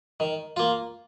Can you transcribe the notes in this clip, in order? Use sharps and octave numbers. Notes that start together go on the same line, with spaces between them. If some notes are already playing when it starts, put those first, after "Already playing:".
D#3
A#3 F4